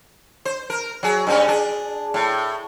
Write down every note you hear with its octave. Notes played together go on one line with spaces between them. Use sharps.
C5
A#4
F#3 G#4
G2 C4 C#4
D4 G#4
A2